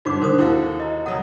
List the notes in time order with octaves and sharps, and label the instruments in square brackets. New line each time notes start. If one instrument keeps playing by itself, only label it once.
[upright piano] G1 D3 C5 [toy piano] D#4 F#4 D6
[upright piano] D3 D#3 [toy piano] A#4 C5 D#6
[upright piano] D#2 F#4 A4 [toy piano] E4 F5
[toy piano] D#5 A#5
[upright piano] C#2 F#3 D#6 [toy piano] F#5